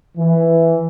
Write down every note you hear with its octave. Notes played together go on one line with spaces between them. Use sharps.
E3